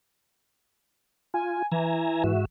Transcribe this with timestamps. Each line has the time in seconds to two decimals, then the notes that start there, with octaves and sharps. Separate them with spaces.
1.34 F4 G#5
1.72 E3 E5 G#5 A#5
2.24 G#2 F#4 E5